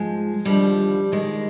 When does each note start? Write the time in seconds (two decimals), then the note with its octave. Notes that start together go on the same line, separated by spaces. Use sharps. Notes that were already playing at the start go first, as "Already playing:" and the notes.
Already playing: G#2 F3 G#3
0.45 D#2 D3 F3 G3
1.12 D#2 D#3 G#3